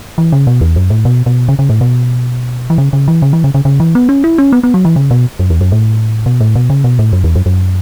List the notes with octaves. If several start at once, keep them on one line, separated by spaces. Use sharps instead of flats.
E3
C#3
B2
E2
F#2
A2
B2
B2
C#3
C#3
A2
B2
E3
C#3
C#3
E3
C#3
E3
C#3
C#3
C#3
E3
B3
C#4
E4
C#4
B3
B3
F#3
E3
C#3
B2
F#2
E2
F#2
A2
B2
A2
B2
C#3
B2
A2
F#2
E2
F#2
F#2